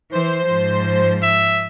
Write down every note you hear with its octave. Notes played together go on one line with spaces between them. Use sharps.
E3 C5
G#2 F3
E5